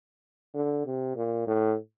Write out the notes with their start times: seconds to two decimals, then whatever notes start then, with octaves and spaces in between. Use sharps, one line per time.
0.54 D3
0.86 C3
1.16 A#2
1.47 A2